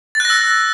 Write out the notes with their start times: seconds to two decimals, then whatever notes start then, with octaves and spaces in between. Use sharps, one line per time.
0.15 A6
0.20 F#6
0.25 A#6
0.30 E6